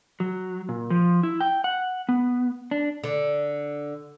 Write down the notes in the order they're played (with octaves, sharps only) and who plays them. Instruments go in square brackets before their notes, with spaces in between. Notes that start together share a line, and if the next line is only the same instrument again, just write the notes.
[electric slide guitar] F#3
A#2
F3
E4
G5
F#5
B3
D4
[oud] D3